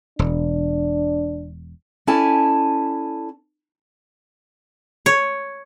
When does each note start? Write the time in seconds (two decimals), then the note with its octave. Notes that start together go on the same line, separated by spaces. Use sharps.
0.19 E1 D4
2.07 C#4 E4 A4 D5 G#5 A5
5.06 C#5